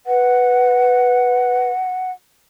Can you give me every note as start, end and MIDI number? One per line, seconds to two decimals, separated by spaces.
0.06 1.70 71
0.06 2.11 78